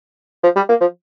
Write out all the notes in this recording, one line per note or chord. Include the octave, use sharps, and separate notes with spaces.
F3
G3
A#3
F3